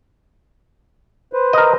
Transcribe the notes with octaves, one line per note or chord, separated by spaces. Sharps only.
B4 C5
A#4 D#5